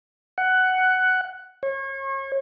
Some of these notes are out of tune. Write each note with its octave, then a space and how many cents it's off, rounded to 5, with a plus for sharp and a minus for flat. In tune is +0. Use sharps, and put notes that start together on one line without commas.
F#5 +10
C#5 -35